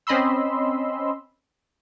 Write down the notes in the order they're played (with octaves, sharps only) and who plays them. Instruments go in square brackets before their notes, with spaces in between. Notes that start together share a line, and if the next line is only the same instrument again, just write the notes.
[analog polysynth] C4 C#4 D#5 B5 C6 E6